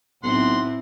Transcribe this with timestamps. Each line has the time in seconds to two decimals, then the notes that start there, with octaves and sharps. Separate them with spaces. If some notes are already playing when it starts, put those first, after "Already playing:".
0.23 B1 A2 C4 E4 F#5 C6